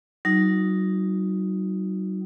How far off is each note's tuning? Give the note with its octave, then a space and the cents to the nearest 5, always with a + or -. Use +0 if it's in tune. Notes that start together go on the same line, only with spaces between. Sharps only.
F#3 +45 D#4 +0 F#4 -40